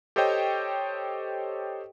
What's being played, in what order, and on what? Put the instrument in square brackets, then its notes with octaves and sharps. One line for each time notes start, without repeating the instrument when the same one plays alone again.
[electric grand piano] G4 A4 C5 C#5 D#5 G5